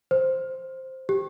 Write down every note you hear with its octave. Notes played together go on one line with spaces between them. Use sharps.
C5
G4